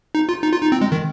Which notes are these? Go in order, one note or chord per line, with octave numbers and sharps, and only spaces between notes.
D#4
F4
D#4
F4
D#4
C4
G#3
D#3